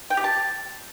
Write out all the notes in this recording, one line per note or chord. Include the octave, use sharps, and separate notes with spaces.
G5
G4
A5